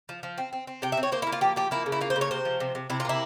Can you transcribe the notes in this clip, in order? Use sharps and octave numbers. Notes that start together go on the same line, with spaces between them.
F3
F3
C4
C4
C4
C3 G5
E5
C4
C#5
A#3 C5
E4
A#3
F4
F3 G4
F3 G4
A#3 E4
C#3
E4
A#3 F4
C5
C#3
C#5
C3 C5
F3
C3
C3
C3 E4
F4
A#3 E4